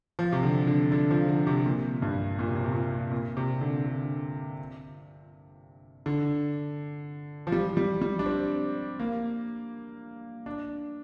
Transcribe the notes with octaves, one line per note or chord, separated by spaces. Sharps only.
F3
C3
D3
D3
D3
F3
D3
C3
A#2
G2
A#2
C3
A#2
C3
A#2
A#2
C3
D3
D3
D3
F3
G3
G3
G3
D4
C4
A#3
D4